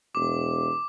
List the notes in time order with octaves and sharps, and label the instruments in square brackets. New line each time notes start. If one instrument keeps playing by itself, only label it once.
[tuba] E1 [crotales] D6